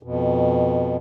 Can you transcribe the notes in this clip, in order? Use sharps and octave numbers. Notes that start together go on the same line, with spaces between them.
F2 B2